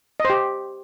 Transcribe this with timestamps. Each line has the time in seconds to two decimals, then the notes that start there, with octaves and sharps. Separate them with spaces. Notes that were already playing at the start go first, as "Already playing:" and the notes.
0.20 D#5
0.25 C5
0.30 G4